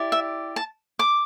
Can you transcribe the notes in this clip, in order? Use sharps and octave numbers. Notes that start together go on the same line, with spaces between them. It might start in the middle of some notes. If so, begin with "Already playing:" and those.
Already playing: E4 G4 D5
E5
A5
D6